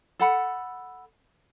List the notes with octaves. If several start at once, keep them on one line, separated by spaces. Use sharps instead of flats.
A4 F#5 B5